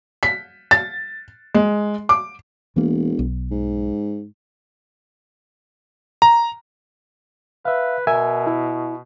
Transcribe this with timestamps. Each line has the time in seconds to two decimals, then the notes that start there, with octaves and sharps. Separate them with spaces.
0.23 B6
0.71 A6
1.55 G#3
2.09 D6
2.76 E1 E3 A#3
3.19 B1
3.51 G#2
6.22 A#5
7.65 B4 E5 F5
8.07 B2 A#4 E5 G#5
8.47 E4